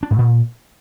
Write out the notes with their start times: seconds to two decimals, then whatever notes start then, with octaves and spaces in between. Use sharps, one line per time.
0.03 D4
0.11 G#2
0.19 A#2